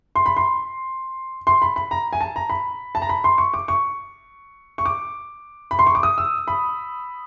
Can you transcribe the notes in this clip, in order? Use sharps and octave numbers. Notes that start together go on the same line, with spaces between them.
C6
B5
C6
C6
B5
B5
A#5
G#5
A5
A#5
B5
A5
A#5
B5
C6
C#6
D6
C#6
C#6
D6
B5
C6
C#6
D6
D#6
E6
B5